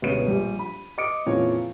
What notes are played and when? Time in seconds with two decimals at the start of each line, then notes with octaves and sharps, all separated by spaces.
0.02 G1 C#2 B2 C#5 D#7
0.27 A#1 G3
0.59 B5
0.98 D#5 D6 D#6 C#7 D7
1.26 F2 A#2 C#3 E3 F4 C#5